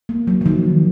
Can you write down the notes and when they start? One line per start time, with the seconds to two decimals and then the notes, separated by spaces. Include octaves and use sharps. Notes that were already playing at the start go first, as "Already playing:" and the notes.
0.09 A#3
0.27 F#3
0.41 F3
0.46 D#3